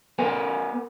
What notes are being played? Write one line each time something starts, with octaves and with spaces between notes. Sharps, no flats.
B3 A#4 B4 G#5